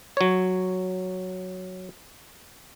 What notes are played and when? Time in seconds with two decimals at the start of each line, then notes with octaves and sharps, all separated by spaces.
0.17 F#3 C#5